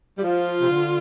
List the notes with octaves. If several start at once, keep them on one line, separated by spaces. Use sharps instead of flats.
G3
F3 F4
C3
D3